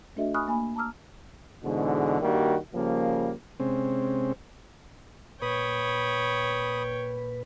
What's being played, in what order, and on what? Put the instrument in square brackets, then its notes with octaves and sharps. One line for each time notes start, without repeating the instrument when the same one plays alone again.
[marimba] A3 D4 F#4 A4 D#5 E5
G#5 B5 C#6 D#6 F6 F#6
A#3 G#5 B5
A5 A#5 D6 E6 F6
[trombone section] E2 G#2 B2 D3
G2 D#3 G3 A#3 F#4
C#3 F3 G3 A#3
[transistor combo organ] C3 G#3 C4 C#4
[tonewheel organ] A#2 B4 [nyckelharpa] C#5 G5 [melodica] B5 D#6